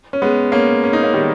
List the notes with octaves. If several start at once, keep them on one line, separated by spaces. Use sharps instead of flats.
C#4
G#3 B3
A#3 C#4
C#4
D#4
A#3 C#4
D#3 G3